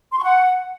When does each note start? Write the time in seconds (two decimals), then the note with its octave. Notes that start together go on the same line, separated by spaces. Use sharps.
0.12 C6
0.18 C#6
0.24 F#5